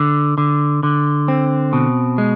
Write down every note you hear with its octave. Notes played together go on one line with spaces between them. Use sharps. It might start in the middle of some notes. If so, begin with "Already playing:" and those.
Already playing: D3
D3
D3
C4
B2
G#3